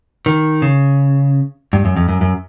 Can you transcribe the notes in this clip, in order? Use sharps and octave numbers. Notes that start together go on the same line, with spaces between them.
D#3
C#3
G2
F#2
F2
F#2
F#2